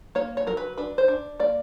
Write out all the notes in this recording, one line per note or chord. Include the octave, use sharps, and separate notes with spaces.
A#3 C#5
C#5
F#3 A#4
B4
D4 B4
C5
D4
A#3 D5